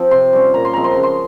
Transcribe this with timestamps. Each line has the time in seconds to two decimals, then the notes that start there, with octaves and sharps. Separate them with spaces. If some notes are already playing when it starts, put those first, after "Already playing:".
Already playing: F3 C4
0.11 C3 C6
0.33 G3 C#4
0.54 A#2 A#5
0.65 C6
0.73 F3 G#3 C4 A#5
0.84 C6
0.94 C#3 A#5
1.03 C6